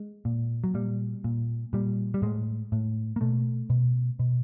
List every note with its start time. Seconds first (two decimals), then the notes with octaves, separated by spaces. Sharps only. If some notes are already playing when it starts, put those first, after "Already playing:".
Already playing: G#3
0.25 A#2
0.64 F#3
0.74 A#2 G3
1.24 A#2
1.73 A#2 G3
2.14 G3
2.22 A2 G#3
2.72 A2
3.16 A#3
3.21 B2 A3
3.70 B2
4.19 B2